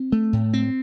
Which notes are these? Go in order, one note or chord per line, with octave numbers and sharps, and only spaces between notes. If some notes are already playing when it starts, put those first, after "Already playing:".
Already playing: C4
A3
A2
C4